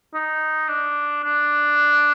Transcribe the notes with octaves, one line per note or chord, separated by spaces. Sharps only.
D#4
D4
D4